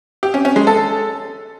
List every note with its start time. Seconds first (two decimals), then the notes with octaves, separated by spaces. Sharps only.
0.23 G4
0.34 C#4
0.45 C#4
0.56 G#3
0.67 A4